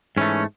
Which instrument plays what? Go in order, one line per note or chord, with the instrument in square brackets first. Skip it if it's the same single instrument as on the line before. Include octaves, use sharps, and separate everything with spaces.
[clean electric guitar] G#2 E3 A3 C#4